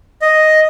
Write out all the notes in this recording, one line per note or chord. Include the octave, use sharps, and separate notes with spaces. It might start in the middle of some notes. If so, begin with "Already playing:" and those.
D#5